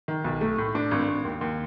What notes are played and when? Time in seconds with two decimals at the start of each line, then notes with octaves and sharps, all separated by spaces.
0.08 D#3
0.24 B1
0.41 A3
0.58 A2
0.75 D4
0.91 G#1
1.08 G#1
1.25 D#2
1.41 D#2